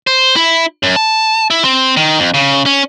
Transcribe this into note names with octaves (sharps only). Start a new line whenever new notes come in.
C5
E4
F#2
A5
E4
C4
D#3
F2
C#3
C#4